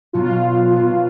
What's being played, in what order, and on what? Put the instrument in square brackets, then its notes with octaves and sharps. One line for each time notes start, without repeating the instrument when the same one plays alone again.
[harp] B2 F#3 B3 F#4 [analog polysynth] F4
[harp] B2 F#3 B3 F#4